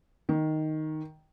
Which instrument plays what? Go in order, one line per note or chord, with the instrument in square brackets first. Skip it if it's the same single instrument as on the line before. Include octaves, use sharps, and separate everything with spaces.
[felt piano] D#3